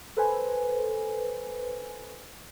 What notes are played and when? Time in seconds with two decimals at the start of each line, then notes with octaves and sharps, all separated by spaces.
0.17 A4 B4 C5 G#5